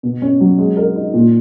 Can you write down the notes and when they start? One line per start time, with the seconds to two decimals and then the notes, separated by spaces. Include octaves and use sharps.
0.03 B2
0.22 C#4
0.41 F#3
0.58 G#3
0.77 A#4
0.96 D#4
1.13 A#2